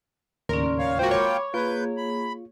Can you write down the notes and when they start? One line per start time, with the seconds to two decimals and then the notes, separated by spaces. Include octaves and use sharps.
0.49 D#2 A2 C#3 C#4 A#4 D5 C6
0.79 C#5 F5
0.99 G#3 A#3 F4 F#4 A#4 C5 G5
1.11 C#5 B5 D6
1.54 A#3 F4 G#4 B4 G6
1.97 B5